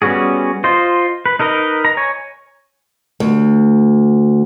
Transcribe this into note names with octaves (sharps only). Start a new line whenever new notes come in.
G3 B3 C#4 F#4 G#4
F4 C5 D#5
B4
D#4 A#4 B4 D#5
A#5
C#5 G#5
D2